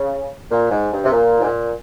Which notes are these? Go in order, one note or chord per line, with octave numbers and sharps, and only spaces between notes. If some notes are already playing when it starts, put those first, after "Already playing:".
Already playing: C#3
A#2
G#2
G2
C3
A#2
G#2
A#2